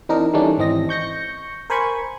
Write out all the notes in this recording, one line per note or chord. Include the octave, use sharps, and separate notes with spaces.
E3 C4 D4 D#4 A#4
D#3 E3 G3 A3 C#4 D4
G#1 E3 C4 D#5 A#6
C#6 G6 A#6 C#7
A#4 C5 G#5 B5 C#6 G#6